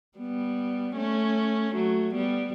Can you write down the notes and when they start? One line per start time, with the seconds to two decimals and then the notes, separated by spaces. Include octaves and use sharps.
0.18 G3 B3
0.96 A3 C#4
1.74 F#3 A3
2.14 G3 B3